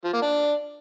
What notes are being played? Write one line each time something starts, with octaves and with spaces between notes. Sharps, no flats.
F3
A#3
D4